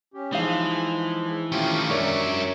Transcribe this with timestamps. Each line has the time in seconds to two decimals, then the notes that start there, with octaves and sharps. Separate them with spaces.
0.14 C#4 G4
0.32 E3 F3 G#3 D#4 F5
1.52 D#3 A3 C#4 F4 G4
1.90 F#2 F#3 D4 A#4 C#5 D5 E5